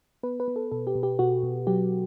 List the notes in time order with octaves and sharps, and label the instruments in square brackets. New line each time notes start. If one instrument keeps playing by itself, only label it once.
[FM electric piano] B3 B4
B4
B3
A4
B2 A4
G4
B2
G4
B2 F#4
B2
F#3 G4